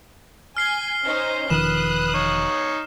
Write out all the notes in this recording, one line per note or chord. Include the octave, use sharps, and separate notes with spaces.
G#5 F6 C7 G7
C#4 D#4 C5
E1 D#3 F3 B4 D#6 F#6 E7
D#4 C#5